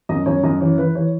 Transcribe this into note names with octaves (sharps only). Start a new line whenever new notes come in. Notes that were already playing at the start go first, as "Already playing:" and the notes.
F#2 D#5
F#2 C#5
F#2 D#5
E3 C#5
E3 B4
E3 C#5